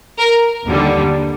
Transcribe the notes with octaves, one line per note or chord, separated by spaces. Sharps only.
A#4
D#2 D3 G3